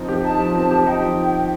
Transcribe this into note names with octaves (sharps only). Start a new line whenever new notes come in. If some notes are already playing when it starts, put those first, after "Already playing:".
Already playing: F3 C4 D#4
G4
D#4 A5
F3
C4
G4
D#4 G5
F3